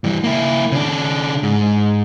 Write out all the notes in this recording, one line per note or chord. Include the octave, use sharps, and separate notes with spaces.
G2 E3
A#3 E4
C#3 D4
G#2